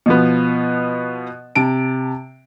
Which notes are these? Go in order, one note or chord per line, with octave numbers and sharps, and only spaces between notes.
B2 F3 B3
C3 A5 D7